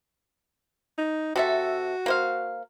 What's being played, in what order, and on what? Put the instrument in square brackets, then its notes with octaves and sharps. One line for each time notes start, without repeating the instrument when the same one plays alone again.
[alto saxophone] D#4
[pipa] C3 A4 E5 [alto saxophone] F#4
[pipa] A#3 C5 F5